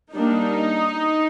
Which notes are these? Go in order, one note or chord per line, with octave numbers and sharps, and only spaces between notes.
G3 A#3 D4 D#4